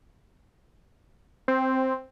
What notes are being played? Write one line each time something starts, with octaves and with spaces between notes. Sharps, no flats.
C4